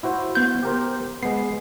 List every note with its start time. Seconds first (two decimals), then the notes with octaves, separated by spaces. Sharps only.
0.03 E4 F#4 C5
0.35 B3 G6
0.63 G4 A#4 C5
1.23 G#3 B3 C7